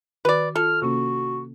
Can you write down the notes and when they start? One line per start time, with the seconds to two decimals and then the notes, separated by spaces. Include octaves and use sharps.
0.25 D#3 F#4 B4 D5
0.55 F4 A4 F6
0.82 C3 A#3 C#4 F#4